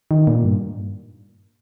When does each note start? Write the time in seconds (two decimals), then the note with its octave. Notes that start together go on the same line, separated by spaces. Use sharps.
0.11 D#3
0.27 A#2
0.44 G2